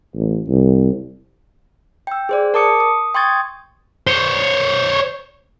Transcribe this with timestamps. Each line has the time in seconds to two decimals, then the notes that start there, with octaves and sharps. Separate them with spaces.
0.15 A1
0.49 C2
2.07 G5 E6
2.29 G#4 C5 D5
2.54 A#4 A5 D6 D#6 C#7
2.80 D#6
3.15 G5 C6 C#6 D#6 G#6 A6
4.07 C5 C#5